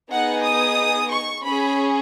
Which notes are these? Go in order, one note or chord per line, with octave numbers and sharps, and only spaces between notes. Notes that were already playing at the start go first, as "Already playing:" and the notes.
B3 D#4 G#4 F#5
D#6
C#6
C#4 G#4 B5